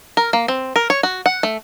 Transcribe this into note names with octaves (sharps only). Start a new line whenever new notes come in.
A#4
A#3
C4
A#4
C#5
F#4
F#5
A3